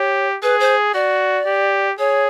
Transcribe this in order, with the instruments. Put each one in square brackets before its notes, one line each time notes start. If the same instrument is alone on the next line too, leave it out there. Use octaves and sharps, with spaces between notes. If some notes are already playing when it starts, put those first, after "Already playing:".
Already playing: [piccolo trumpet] G4 [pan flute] C#5
[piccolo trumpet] G#4 [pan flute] B4
[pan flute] C5
[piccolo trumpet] F#4 [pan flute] D5
[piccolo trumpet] G4
[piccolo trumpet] G#4 [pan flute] C#5